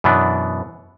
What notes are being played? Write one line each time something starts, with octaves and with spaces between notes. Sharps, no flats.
F#2 B2 E3 B3 D4